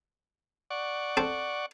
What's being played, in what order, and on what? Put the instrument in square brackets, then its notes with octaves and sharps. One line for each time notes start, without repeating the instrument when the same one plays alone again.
[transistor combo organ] D5 F#5 C#6
[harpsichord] C4 A4